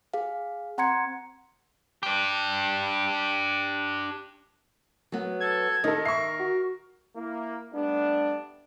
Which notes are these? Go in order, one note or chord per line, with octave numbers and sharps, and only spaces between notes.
G#4 F5
C4 F#5 A#5 C6 G#6 C#7
D4 G4
F#3 B3
A4 G#6
D#3 D#4 A4 A#4
E5 C#6 C7
F#4
A#3 E4
G3 A3 B3 D4